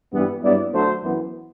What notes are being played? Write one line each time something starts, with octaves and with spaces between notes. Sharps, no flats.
G2 E3 G3 B3
G2 F#3 B3 E4 D5
D2 D3 F#3 A3 D4 C5
F#2 E3 B3